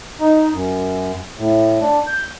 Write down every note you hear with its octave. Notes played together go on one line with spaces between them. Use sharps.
D#4
F#2
A2
D4
G6